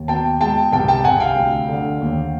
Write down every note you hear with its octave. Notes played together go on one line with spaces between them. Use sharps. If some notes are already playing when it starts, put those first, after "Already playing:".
Already playing: D#2
B2 G5 A5
G#3 G5 A5
C2 G5 A5
G5 A5
C2 F#5 G#5
F5 G5
D2
D3
D#2